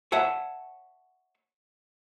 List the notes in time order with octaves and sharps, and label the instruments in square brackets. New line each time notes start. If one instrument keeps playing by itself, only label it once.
[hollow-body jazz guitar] C#5 E5 F#5 A5